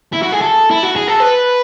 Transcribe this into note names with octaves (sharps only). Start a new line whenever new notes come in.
E4
F#4
G#4
A4
E4
F#4
G#4
A4
B4